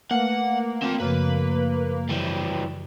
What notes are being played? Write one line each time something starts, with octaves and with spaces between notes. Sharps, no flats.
A3 A#3 B4 F#5
C4 A5
F#2 C#3 F3 B4
E3 G3